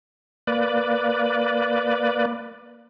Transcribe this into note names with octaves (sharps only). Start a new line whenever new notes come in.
A#3 B4 D5